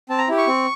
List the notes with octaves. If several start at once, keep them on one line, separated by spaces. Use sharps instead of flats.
C4 A5
A#5
E4 G4
C#6
C4